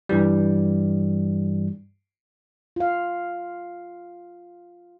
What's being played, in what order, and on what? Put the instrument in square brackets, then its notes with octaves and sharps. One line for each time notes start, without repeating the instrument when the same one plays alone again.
[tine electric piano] G2 E3 G3
[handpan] F4 F5